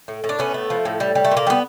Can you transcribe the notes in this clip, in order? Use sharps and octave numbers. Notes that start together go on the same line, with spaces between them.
A2
A2
D4
A2 B3 C#4
A3
F3
A2
G3
G3
A3
A#2
A#3
G3 B3